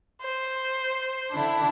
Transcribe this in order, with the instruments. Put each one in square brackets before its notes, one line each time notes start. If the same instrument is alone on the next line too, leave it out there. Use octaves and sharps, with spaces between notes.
[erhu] C5
[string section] D3 D4 E4